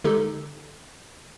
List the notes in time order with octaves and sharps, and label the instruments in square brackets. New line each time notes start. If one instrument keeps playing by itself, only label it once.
[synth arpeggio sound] D3 G#3 D#4 G4 A4